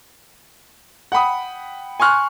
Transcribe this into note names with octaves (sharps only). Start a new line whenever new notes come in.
F#5 G5 B5 D#6
G#5 C6 C#6 F6 F#6